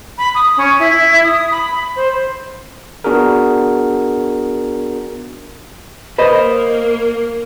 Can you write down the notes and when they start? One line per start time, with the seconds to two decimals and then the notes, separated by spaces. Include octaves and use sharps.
0.18 B5
0.35 D#6
0.57 C#4
0.79 E4
1.23 D#6
1.51 B5
1.96 C5
3.04 B3 D4 F#4 G#4 A#4
6.18 A#3 B4 C5 D#5